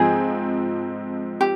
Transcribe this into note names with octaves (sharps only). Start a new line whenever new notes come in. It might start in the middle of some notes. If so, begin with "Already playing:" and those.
Already playing: G#2 F3 C4 G#4
G4